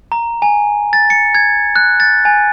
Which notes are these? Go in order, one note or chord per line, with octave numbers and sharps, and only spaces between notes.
A#5
G#5
A6
C#7
G#6
F#6
A6
G#5